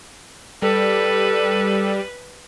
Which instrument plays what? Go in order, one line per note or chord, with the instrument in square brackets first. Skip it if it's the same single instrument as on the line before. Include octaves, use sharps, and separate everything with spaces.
[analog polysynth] G3 [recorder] A4 [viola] B4